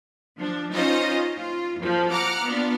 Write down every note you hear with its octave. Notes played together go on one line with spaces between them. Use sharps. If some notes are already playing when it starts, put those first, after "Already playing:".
F3 D4
C#4 D#4 F4 C5 D#5
F4
F2 F3
F#5 A#5 D6 F6 F#6
B3 D4 F4